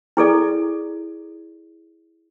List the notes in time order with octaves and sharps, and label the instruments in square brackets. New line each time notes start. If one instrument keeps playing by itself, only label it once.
[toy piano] E4 G#4 A4 D5